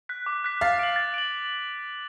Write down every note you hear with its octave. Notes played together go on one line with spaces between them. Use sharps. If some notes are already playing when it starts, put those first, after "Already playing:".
F#6 B6
D6
F#6 B6
F5 A6
D7 F#7
A6
D7 F#7